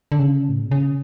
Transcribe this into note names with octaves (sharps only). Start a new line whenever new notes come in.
D3
C#3
A2
B2
C#3